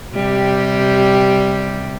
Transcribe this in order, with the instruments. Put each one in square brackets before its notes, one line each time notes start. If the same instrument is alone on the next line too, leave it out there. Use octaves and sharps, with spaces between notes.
[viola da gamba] C3 G3 G4